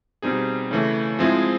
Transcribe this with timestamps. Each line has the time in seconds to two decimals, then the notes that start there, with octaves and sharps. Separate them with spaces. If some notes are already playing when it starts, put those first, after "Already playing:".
0.22 B2 G3 C4 D#4 G#4
0.71 C#3 E3 A3
1.19 F3 G#3 C4 E4 G#4